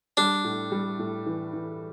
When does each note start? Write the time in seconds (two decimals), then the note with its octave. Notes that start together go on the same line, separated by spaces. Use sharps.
0.17 G3 D4
0.44 A2
0.72 G3
0.99 A2
1.26 E3
1.53 E3